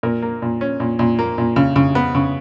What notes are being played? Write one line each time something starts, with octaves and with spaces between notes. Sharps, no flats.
A#2 A#4
A#3
A#2
C#4
A#2
A#2
A#3
A#2
C#3
C#3
B3
C#3